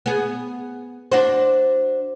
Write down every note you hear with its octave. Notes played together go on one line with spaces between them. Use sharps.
B3 G#4
D4 F#4 C5